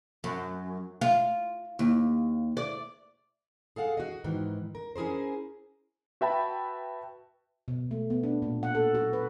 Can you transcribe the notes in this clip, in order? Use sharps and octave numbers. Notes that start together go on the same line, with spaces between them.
F#2
F4
D#2
D5
G#4 A4 F5 F#5
F#4 D#5
G#2 D#3 E3
A#4
C#4 E4 G#4 A#4 C5
F#4 B4 E5 G5 A5 B5
B2
A3
B3
D4
A#2
F#5
A4
F#4
B4